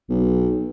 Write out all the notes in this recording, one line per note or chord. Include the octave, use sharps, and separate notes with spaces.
B1